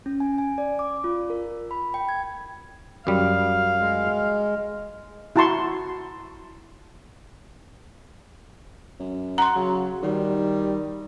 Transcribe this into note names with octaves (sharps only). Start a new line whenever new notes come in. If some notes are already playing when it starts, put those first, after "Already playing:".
C#4
G#5
G#5
D5
D6
F4
A#4
B5
G5
G#6
F#2 G3 F5
G#3
E4 F#4 A5 A#5 C6 C#6
F#2
F#5 A#5 C6
C#3 F#3
D#3 G3